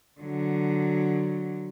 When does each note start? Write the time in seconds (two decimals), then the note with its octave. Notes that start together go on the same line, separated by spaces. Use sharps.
0.21 D3 F#3